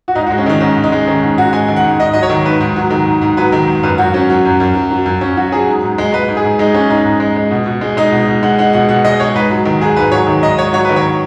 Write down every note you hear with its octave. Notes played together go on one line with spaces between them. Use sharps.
F#4
G#2 D#4
F#4
G#3
C#4
D#3 D#4
G#2 C#4
G#2
D#4
G#3
D#3 C#4
G#2
G#2 F#4
G#3 G#5
D#3
F#5
G#2
G#2 D#5
F#3 D#5
C#5
D#3
G#2 B4
G#2
F#3
D#3
G#2
G#2
F#3 B4
D#3
G#2
F#2 B4
F#2 F#4
F#3 C#4
F#3
F#2
F#2
F#3
F#3
F#2
F#2 C#4
F#3 F#4
F#3 G#4
G#2
G#2
G#3
G#3 B4
G#2
G#4
G#2
G#3 D#4
G#3 C#4
G#2 D#4
G#2
G#3
G#3
B2
B2
G#3
G#3 D#4
B2
B2
G#3 F#5
G#3 F#5
B2 F#5
B2 F#5
G#3 D#5
G#3 C#5
G#2 B4
F#3
D#3
G#2 G#4
G#2 B4
F#3 C#5
D#3
G#2 D#5
G#2 C#5
F#3 C#5
D#3 B4
C#5